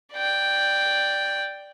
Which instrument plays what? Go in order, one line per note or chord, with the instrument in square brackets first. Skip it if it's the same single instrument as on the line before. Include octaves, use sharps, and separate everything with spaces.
[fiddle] D5 G5